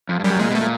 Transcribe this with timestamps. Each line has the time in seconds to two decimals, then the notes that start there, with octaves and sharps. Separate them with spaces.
0.09 F2
0.19 G2
0.24 F#2 G3
0.39 A#2 G#3
0.51 B2 A3
0.60 A#2